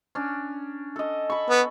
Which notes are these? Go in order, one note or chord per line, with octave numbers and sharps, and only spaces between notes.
C#4 D4
A4 D#5
B5 C#6
B3